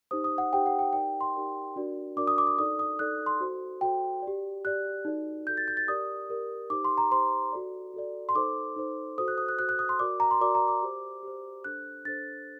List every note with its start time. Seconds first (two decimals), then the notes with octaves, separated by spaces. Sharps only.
0.11 D#4 G4 C5 D#6
0.24 D#6
0.38 F#5
0.53 D#4 G4 C5 G5
0.66 F#5
0.79 G5
0.93 D#4 G4 A#4 D5 G5
1.21 C6
1.35 D#4 G4 A#4 D5
1.76 D4 F#4 A#4 D5
2.16 D4 F#4 A#4 D5 D6
2.27 D#6
2.38 D6
2.47 D#6
2.58 D#4 A4 D5 D#6
2.79 D#6
2.99 D#4 A4 D5 F#6
3.26 C6
3.40 F#4 A4 C5
3.81 F#4 A4 C5 G5
4.22 D5
4.27 G4
4.65 G4 D5 F#6
5.05 D#4 F#4 A4 D5
5.47 D#4 F#4 A4 D5 G6
5.57 A6
5.68 G6
5.77 A6
5.88 G4 A#4 D5 D#6
6.30 G4 A#4 D5
6.70 D#4 G4 C5 D6
6.85 C6
6.98 A#5
7.11 D#4 G4 C5 C6
7.52 F#4 A4 D5
7.94 F#4 A4 D5
8.29 C6
8.35 D#4 A4 C5 D6
8.76 D#4 A4 C5
9.18 F#4 A4 C5 D#6
9.28 F#6
9.38 D#6
9.49 F#6
9.59 F#4 A4 C5 F#6
9.69 F#6
9.79 D#6
9.89 C6
9.99 F#4 A#4 D5 D6
10.20 A#5
10.31 C6
10.40 F#4 A#4 D5 D6
10.55 A#5
10.68 D6
10.82 G4 C5
11.23 G4 C5
11.64 D4 A4 C5 F#6
12.05 D4 A4 C5 A6